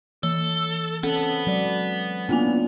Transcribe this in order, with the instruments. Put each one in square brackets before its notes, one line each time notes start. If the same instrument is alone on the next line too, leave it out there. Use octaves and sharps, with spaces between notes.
[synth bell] E3 [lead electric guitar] A4
[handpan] C4 C#4 A4 [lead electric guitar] B4 F#5
[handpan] F#3 G#3 D5
[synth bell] A#3 B3 G#5 [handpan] C#4 D4 F4